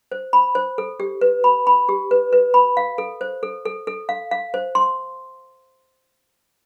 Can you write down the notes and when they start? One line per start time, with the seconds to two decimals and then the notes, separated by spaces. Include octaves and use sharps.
0.12 C5
0.33 B5
0.55 C5
0.78 A4
1.00 G4
1.21 B4
1.44 B5
1.67 B5
1.89 G4
2.11 B4
2.33 B4
2.54 B5
2.77 F5
2.98 A4
3.21 C5
3.43 A4
3.65 A4
3.87 A4
4.09 F5
4.31 F5
4.54 C5
4.75 C6